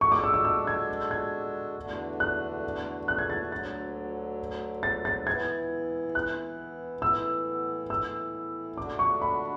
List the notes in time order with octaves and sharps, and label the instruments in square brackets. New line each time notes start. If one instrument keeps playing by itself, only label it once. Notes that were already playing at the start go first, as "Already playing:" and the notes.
[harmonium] G#3 D4 F#4 A4 [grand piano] C#6
[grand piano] D6
E6
E6
E6
G#6
G#6
[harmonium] E2 D3 A3 D4 F#4
[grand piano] F#6
F#6
G#6
A6
[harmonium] D2 D3 F#3 [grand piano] A6
[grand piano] A6
A6
[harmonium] E3 B3 E4 [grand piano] G#6
[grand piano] F#6
[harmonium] A2 E3 B3 E4 [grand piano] E6
[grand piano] E6
[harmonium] D3 A3 D4 F#4 [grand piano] D6
[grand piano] C#6
B5